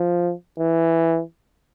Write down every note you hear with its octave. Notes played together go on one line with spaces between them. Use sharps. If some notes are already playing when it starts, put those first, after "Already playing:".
Already playing: F3
E3